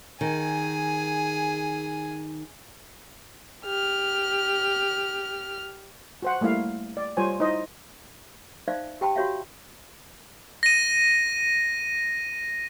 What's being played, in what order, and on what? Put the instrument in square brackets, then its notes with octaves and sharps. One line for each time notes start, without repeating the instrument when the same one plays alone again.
[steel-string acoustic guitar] D#3 [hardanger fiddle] G#4 G#5
[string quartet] G4 F6
[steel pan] F#4 C5 F#5
G3 A3 A#3 E4 F5
D5
G3 F4 C5 C#5 G#5
D#4 E4 C5 D#5
[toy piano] D#4 C5 D5 E5 F5
G4 G5 A5 B5
F#4 G4 C#5 E5 F5
[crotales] A#6 D#7